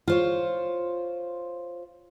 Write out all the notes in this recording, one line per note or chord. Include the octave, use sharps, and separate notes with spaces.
F4 C5 C#5